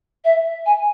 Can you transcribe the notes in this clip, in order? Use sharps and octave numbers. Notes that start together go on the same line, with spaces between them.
E5
G#5